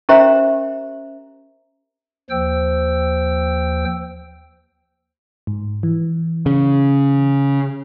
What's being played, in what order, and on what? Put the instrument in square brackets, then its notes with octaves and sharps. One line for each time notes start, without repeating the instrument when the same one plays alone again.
[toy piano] C#4 G4 A#4 C5 E5 A#5
[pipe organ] D#2 F3 C5 G5 E6
[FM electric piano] G#2
E3
[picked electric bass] C#3